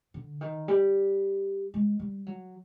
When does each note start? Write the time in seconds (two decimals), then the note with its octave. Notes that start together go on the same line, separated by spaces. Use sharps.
0.14 D3
0.41 D#3
0.68 G3
1.74 G#3
1.99 G3
2.26 F#3